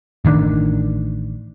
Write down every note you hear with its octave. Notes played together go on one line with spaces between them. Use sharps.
A1 D#3 E3 D4